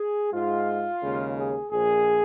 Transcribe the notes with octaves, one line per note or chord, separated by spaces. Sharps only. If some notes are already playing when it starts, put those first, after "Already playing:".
Already playing: G#4
G#2 G#3 F4
D#2 C#3 G#3
G#4
A#1 A#2 F3 G#4